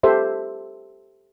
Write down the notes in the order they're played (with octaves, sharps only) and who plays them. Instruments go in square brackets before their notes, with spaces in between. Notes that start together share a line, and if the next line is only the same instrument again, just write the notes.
[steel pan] G4 A4 C5 E5